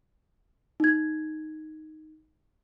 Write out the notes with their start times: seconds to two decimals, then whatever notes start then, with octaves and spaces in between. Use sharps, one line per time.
0.80 D#4 G#6